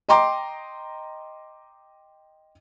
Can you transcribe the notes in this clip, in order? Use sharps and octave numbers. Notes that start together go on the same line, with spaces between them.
D#5 G5 A#5 C6 D6